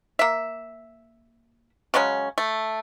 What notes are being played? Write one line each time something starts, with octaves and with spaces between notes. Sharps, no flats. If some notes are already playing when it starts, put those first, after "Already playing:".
A#3 E5
C#3 F#3 G#3 C#4
A3